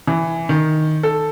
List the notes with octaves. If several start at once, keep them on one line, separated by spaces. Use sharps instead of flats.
E3
D#3
A4